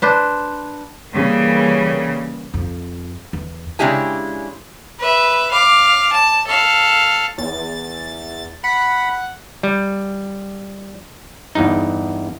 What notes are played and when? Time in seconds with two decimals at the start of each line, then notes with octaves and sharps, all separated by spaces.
0.02 D4 B4 C5
1.09 C#3 E3 G3 A#3
2.54 F2
3.33 E2
3.79 C#3 G#3 D4 E4 G4 G#5
4.99 B4 E5
5.51 F5 D6
6.12 A5
6.47 A4 F5
7.38 E2 A6
8.64 F#5 B5
9.63 G3
11.55 E2 G2 D#4